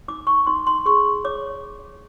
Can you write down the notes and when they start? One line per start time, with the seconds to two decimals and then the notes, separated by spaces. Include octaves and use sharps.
0.08 D#4 D6
0.27 C#6
0.47 D#4 C6
0.67 C6
0.86 G#4 C#6
1.25 C#5 D6